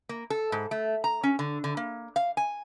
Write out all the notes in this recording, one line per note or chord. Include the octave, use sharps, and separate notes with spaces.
A#3
A4
G#2
A3
A#5
C#4
D3
D3
A#3
F5
G#5